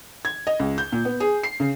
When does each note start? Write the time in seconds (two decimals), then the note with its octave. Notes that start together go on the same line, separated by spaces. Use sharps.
0.25 G#6
0.47 D#5
0.59 C#2
0.78 G6
0.92 A#2
1.05 B3
1.20 G#4
1.43 C7
1.60 C#3